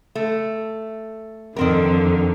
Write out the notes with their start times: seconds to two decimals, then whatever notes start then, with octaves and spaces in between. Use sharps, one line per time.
0.15 A3
1.56 F2 D3 D#3 C4 A#4